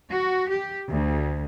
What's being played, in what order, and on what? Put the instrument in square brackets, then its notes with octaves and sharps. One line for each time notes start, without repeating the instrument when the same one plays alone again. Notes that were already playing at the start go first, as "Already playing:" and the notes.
[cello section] F#4
G4
D2